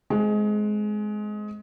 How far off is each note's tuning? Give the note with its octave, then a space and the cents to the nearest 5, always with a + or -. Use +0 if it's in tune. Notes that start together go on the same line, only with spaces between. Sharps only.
G#3 +20 C4 +0